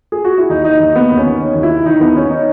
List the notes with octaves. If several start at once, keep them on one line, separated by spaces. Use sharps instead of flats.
G#4
F#4
E4
D#2 D#4
D#3 D#4
D#2 D#4
A#3 B3
D#2
C#4
D#2
D#3
D#2
E4
D#3
D#3 D#4
D#2 B3
D#3 C#4
D#4